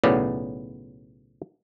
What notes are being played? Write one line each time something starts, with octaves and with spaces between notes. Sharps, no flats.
B1 A2 C#3 B3 D5